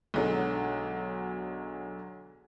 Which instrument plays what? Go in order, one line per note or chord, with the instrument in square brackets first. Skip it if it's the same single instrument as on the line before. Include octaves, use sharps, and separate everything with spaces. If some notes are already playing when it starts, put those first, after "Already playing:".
[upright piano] B1 D3 F#3 G#3